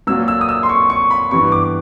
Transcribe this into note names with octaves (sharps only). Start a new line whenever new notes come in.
A#2 F#3 A#3 E6
E6
D#6
E6
C6
C#6
C#6
B5
G2 E3 G3 B3 C#6
D6